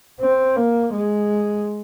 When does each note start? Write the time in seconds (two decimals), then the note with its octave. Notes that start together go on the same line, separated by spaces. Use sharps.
0.20 C4
0.57 A#3
0.93 G#3